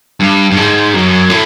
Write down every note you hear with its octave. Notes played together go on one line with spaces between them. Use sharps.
G2
G2
G#2
F#2
A2